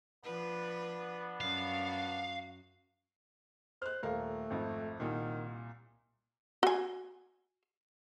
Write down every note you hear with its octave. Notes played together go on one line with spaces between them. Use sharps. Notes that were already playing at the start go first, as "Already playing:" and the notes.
F3 B3 D4 B4
F#2 F#4 F5
C5 F6 F#6
D#1 A3 A#4 F5
G#1 F2
C2 A#2 D#3
F#4 G#5